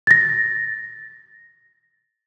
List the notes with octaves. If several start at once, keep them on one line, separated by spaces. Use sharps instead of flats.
A6 A#6